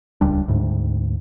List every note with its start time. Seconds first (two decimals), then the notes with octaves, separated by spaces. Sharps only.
0.21 D#1 C#2 G3 D4
0.48 D2 G#2